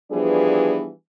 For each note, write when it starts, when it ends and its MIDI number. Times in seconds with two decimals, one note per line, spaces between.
0.12 0.89 52
0.12 0.89 53
0.12 0.89 55
0.12 0.89 59
0.12 0.89 62
0.12 0.89 68